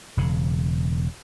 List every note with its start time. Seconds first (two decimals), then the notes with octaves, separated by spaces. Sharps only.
0.17 E1 C#3